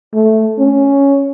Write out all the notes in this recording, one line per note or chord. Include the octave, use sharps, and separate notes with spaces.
A3
C#4